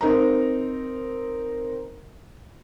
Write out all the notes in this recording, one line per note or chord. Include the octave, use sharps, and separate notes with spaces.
C4 D#4 A#4 A#5